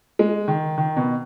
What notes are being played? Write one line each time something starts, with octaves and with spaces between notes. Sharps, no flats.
G#3
D#3
D#3
B2